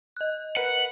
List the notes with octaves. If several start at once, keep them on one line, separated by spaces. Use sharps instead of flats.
D#5 F#6
A#4 B4 F#5